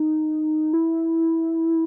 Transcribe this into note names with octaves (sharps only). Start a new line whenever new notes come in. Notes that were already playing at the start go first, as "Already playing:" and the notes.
Already playing: D#4
E4